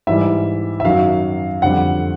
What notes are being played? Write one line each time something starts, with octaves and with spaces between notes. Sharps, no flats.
G#2 E3 G3 E5
E5
F#2 D#3 F#3 F5
F2 D3 G3 F#5